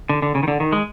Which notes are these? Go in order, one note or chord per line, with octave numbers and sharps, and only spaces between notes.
D3
D3
C#3
D#3
D3
D#3
G#3